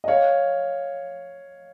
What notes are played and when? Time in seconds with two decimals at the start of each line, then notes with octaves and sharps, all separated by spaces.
0.04 D#5
0.08 C#5 F5